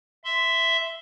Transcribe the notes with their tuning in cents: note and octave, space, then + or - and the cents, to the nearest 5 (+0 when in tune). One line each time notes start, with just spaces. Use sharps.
E5 +0 C6 -15